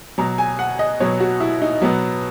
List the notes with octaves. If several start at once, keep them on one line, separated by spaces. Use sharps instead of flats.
B2 F#3 A#5
G#5
F#5
D#5
B2 F#3 C#5
F#4
E4
D#4
B2 F#3 B3